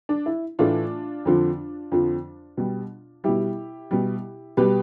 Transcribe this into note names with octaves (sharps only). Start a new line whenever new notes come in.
D4
E4
A2 E3 A3 D4 F4
F2 D3 F3
F2 D3 F3
B2 G3
B2 G3 E4 G4
B2 G3
B2 G3 G4 B4